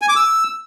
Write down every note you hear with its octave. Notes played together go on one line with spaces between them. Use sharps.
G#5
D6
E6